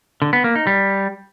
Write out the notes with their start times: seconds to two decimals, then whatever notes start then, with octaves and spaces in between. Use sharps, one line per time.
0.22 D3
0.33 B3
0.44 A#3
0.55 D#4
0.67 G3